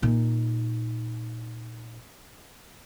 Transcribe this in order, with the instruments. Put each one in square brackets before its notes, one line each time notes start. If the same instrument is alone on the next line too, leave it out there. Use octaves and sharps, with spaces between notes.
[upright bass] A#2 D#4